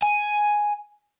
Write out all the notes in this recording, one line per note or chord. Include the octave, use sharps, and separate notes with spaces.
G#5